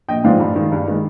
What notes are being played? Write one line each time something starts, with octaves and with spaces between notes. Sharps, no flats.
A#1 D#5 G5
G#2 F3 C4 D5 F5
G2
D#3 G#3
G2
D#3 G#3